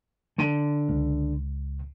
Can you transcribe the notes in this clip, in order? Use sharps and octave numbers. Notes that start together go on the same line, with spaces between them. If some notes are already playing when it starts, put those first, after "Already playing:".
D3
C#2